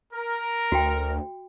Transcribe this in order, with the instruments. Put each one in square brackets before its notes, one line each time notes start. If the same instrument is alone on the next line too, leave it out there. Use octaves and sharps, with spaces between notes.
[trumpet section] A#4
[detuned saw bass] D2 [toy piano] F#4 G5